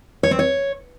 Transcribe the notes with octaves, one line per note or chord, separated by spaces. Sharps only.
C#5
C4
C#5